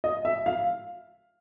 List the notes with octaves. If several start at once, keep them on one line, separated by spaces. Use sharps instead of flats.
D#5
E5
F5